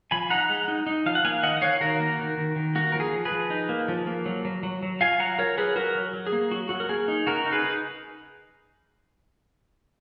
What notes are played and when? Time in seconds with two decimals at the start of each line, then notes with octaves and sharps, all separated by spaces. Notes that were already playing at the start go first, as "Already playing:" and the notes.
0.11 F3 G#5 B5
0.30 D#4 F#5 A#5
0.49 G#3
0.68 D#4
0.86 D#4
1.06 F3 F5
1.15 F#5
1.25 A#3 F5 G#5
1.43 D#3 D#5 F#5
1.57 F#5
1.62 D#3 C#5 F5
1.80 D#3 F#4 A#4
2.00 A#3
2.19 D#3
2.37 D#3
2.56 D#3
2.75 A#3 F#4
2.92 F3 A#4
3.00 G#4
3.13 F3
3.25 G#4 B4
3.32 F3
3.50 D#4
3.69 A#3
3.88 F3
4.07 A#3
4.26 F#3
4.45 F#3
4.63 F#3
4.83 F#3
5.01 F4 F5 G#5
5.19 F#3 F#5 A#5
5.38 F4 A#4 C#5
5.57 F#3 G#4 B4
5.76 F#3 F#4 A#4
5.95 F#3
6.13 F#3
6.27 G#4
6.32 A#3
6.51 F#3 F#4
6.69 F#3 F#4
6.80 A#4
6.89 A#3 G#4
7.08 D#4
7.26 C#3 F#4 A#4
7.46 D#4
7.52 G#4 B4
7.65 D#4